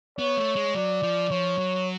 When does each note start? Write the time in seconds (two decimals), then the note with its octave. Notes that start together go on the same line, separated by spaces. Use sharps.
0.19 B3 C#5
0.37 A3
0.56 G#3
0.75 F#3 D5
1.03 F3
1.31 F3 C#5
1.58 F#3